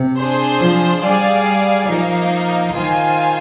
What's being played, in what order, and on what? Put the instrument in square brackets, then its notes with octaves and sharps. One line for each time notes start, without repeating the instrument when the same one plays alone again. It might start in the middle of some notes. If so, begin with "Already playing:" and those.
Already playing: [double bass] C3
[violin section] D4 G#4 C5
[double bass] F3
[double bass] G3 [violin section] G#4 D5 F5 G#5
[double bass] F3 [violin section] A#3 D#4 A#4 F5
[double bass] D#3 [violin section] F4 C5 F5 G#5